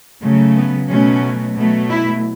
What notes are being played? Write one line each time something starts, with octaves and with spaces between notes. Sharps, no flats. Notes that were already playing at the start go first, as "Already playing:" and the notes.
C#3 F#3 A3
B3
B2 F#3 A3 C#4
B2 F#3 A3
E4